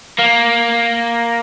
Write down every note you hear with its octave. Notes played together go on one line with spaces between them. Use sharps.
A#3